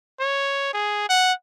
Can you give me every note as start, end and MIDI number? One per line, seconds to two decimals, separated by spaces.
0.20 0.71 73
0.74 1.06 68
1.09 1.33 78